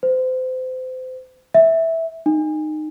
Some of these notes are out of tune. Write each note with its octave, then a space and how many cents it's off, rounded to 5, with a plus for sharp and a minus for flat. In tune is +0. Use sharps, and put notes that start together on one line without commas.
C5 -30
E5 -10
D#4 -20